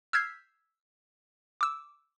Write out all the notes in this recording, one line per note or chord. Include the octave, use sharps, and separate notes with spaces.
E6 F6 G6 G#6 B6 C7
D6 E6